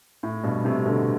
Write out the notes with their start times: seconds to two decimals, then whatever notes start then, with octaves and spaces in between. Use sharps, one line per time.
0.23 A2
0.44 G2 B2
0.65 A2 C3
0.86 B2 D3